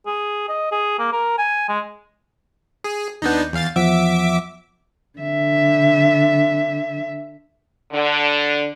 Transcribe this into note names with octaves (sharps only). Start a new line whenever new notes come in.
G#4
D#5
G#4
A#3
A#4
G#5
G#3
G#4
D#2 B3 D4 D#4 G6
E2 F5 A6
E2 F3 E5 F#5 D6
D3 E5
D3